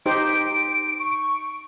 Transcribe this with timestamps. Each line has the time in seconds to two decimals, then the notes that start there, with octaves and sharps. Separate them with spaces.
0.06 D#4 G4 C5 D7
0.99 C#6